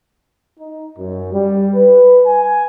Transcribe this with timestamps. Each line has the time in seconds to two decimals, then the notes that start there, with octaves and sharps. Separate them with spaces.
0.59 D#4
0.98 F#2
1.33 G3
1.74 B4
2.27 G#5